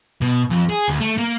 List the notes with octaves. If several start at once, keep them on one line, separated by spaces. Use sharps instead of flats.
B2
F2
G#4
D2
A3
A#3